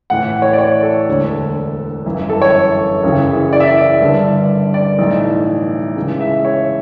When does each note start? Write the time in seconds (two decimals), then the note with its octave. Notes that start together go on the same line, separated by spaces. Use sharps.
0.10 A1 A2 E3 F#5
0.42 C#5
0.53 D5
0.58 C#5
0.83 A4
1.08 E1 D2 D3
2.06 G1 F#2 E3
2.30 A4
2.42 C#5
3.03 F#1 F#2 C#3 E3
3.53 D5
3.60 E5
3.67 D5
4.01 G1 G2 D3
4.74 D5
4.98 B1 A2 E3
5.96 C#2 C#3 E3
6.20 E5
6.45 C#5